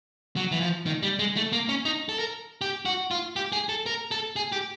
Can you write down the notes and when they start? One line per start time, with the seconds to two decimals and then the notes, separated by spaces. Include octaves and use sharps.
0.36 F#3
0.52 E3
0.61 F3
0.86 D#3
1.03 G3
1.19 G#3
1.36 A3
1.52 A#3
1.69 C#4
1.85 D#4
2.09 A4
2.19 A#4
2.61 G4
2.85 F#4
3.11 F4
3.36 G4
3.52 G#4
3.69 A4
3.86 A#4
4.11 A4
4.36 G#4
4.52 G4